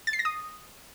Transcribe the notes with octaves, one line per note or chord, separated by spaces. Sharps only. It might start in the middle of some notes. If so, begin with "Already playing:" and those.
A6
C7
A#6
D#6